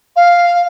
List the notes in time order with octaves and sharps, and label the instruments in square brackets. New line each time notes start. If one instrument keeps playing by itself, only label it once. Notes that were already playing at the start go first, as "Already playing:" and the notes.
[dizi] F5